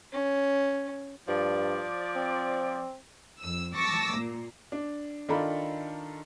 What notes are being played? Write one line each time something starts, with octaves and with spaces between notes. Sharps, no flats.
C#4
G2 F3 D5
C4
F2 E6
A5 C#6 D6 E6 A#6
A#2 A#3
D4
D#3 D4 F4 A4 A#5 B5